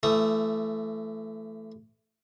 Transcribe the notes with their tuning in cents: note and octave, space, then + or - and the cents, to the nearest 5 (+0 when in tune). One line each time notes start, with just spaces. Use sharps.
E3 +30 A3 +0 D#6 +0